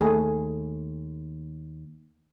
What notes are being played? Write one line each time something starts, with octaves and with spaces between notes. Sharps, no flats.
D#2 A3 G#4